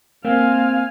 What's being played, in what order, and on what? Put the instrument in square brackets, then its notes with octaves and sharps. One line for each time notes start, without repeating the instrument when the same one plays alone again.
[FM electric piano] A#3 [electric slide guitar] C4 [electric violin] F5 G#5